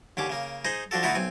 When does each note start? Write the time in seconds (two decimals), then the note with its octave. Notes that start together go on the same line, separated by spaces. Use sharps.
0.17 D#2 D3 C#4 D6
0.30 C#3 A#3
0.65 D#4 G#4 C5 D#5
0.91 F3 D4 F#4 A4
1.03 D3 A3 D#4 E4 F#4 A4
1.15 B1 C4 G#5